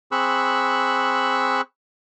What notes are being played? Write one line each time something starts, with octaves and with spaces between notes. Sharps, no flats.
C4 G#4 B5 C#6 E6 F#6